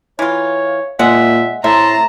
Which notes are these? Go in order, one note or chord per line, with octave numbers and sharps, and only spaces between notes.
E3 F4 C#5
A#2 G#3 E5 F#5
A2 C3 E5 A5 A#5 C6